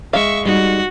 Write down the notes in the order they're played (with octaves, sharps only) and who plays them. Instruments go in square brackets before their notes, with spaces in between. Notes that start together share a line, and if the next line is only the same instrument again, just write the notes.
[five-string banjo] G#3 F5 [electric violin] E5 C#6
[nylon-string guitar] G3 D#4 [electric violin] F#4